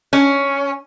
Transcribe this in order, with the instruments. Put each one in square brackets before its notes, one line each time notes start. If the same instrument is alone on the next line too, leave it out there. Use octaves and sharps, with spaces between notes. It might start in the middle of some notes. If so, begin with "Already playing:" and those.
[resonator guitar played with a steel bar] C#4